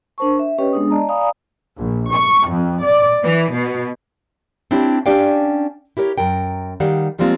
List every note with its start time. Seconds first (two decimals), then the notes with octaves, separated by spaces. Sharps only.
0.18 D4 A#4 C5 A5 C#6
0.39 E5
0.59 C#4 G4 B4 C#5 D#5 G5
0.73 G#3 B3 D4 G#4 D#6
0.91 D5 D#5 A5 A#5
1.09 D5 F5 G#5 A#5 B5 D#6
1.78 A#1
2.13 C#6
2.50 F2
2.85 D5
3.24 E3
3.53 B2
4.71 C4 D4 E4 G4 C#5
5.06 C#4 D4 G4 D5 F5 G5
5.97 E4 G4 A#4 C#5
6.18 F#2 A#4 G5
6.80 D#3 G3 F5 F#5
7.18 F3 G3 G#3 A#3 C4 F4